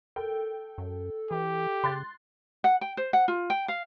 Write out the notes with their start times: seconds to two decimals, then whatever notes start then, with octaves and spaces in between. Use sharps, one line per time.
0.16 A4 A#4 G5
0.78 F#2
1.31 E3 G4
1.84 C#3 C6 F#6 A6
2.64 F#5
2.81 G5
2.97 C5
3.13 F#5
3.28 F4
3.50 G5
3.68 F5